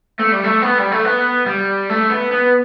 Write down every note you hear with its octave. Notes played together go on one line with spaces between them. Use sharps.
A3
G3
A3
B3
G3
A3
B3
G3
A3
B3
B3